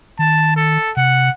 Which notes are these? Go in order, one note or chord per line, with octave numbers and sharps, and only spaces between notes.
D#3 A5
A4
C3 F#5